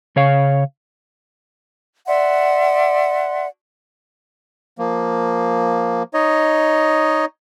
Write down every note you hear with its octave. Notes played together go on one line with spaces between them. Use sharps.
C#3 C#5 F5
D5 E5 F#5 C6
F3 A#3
D#4 C#5 D#5